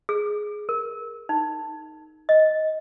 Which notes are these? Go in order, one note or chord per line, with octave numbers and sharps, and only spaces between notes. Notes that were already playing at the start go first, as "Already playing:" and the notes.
G#4
A#4
D#4
D#5